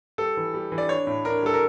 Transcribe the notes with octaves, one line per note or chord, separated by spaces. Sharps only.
G3 A4
E3
G3
E3
D5
D4 C#5
A2
D4 A#4
G3 A4
A#4